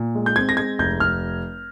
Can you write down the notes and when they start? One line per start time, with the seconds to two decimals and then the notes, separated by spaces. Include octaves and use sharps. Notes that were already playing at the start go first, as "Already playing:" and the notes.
Already playing: A#2
0.15 G#3
0.26 G6
0.36 C4 G#6
0.49 A#6
0.57 G#3 G#6
0.79 F1 G6
1.00 F1 F6